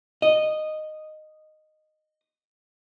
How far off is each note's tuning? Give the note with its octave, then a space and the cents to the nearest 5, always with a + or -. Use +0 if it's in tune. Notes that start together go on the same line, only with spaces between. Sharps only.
D#5 -10